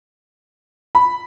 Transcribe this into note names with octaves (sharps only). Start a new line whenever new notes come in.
B5